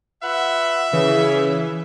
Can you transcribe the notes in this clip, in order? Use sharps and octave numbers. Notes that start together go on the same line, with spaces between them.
F4 B4 E5 F#5
C#3 E3